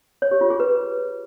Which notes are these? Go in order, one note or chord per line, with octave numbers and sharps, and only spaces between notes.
C#5
G4
F4
G#4
B4